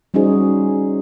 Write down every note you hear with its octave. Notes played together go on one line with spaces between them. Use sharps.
G3 C#4 D#4 F#4 G#4 C5